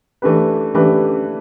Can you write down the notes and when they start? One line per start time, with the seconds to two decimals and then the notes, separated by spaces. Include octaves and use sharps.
0.22 E3 A3 D4 G4 B4
0.75 E3 A3 D4 G4 B4